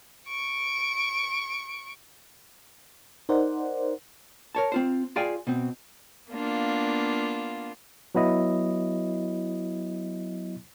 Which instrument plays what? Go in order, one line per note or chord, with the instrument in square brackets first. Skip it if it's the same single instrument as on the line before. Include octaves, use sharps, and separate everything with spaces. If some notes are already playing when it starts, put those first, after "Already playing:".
[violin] C#6 D7
[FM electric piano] D#4 A#4 C5 D5 F#5
[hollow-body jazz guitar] A#4 C#5 A5
C4 F4 C5
F4 G#4 D5 F5 G5 G#5
B2 C4
[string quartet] A#3 B3 D4 F4
[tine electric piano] F#3 B3 E4 D#5